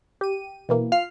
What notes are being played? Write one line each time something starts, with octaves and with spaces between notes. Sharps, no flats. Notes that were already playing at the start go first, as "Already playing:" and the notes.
G4 D#7
B2 E3 A#3
F4 F6 C7